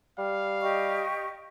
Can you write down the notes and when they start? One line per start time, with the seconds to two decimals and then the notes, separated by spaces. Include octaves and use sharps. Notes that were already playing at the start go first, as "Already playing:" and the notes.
0.18 G3 F5
0.62 G4 D#5 C#6